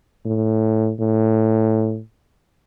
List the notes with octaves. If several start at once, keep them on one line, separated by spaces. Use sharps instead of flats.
A2
A2